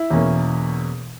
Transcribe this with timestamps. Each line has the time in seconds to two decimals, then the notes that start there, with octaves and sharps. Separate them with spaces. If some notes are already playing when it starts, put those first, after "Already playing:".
Already playing: E4
0.10 E2 B2 A#3 C#4